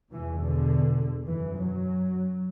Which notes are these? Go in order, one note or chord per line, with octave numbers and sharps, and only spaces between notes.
E2 B2 E3
D3
F#2 E3
F#3